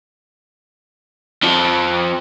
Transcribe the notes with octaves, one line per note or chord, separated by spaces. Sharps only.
F2 F3